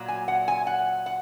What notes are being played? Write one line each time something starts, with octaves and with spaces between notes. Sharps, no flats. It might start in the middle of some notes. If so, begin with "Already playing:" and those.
Already playing: A#2 F#3
G#5
F#5
G#5
F#5
F#5